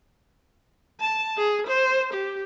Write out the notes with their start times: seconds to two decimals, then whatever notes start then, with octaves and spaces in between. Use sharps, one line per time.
1.00 A5
1.37 G#4
1.67 C5
2.13 G4